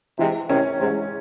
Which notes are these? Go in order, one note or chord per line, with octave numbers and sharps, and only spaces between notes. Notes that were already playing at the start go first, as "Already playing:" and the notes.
G#2 C3 E3
C3 D#3 C#4
G#2 C3 G#3